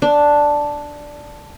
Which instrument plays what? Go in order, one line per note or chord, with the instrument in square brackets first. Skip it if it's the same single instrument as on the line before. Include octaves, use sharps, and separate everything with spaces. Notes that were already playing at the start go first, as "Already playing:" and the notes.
[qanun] D4